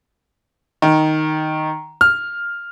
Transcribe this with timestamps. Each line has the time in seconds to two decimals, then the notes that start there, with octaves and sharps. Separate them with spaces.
0.82 D#3
2.01 F6